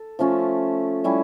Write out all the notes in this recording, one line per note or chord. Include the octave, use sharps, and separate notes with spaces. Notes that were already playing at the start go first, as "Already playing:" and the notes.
Already playing: A4
F3 A3 C#4 F4
G3 C#4 E4